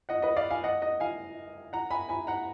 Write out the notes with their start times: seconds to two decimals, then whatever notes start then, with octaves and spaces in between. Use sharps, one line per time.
0.09 D#5 F#5
0.22 B4 D#5
0.36 D5 F5
0.51 F5 G#5
0.64 D#5 F#5
0.82 D#5 F#5
1.00 F5 G#5
1.73 F#5 A#5
1.91 G#5 B5
2.09 G#5 B5
2.27 F#5 A#5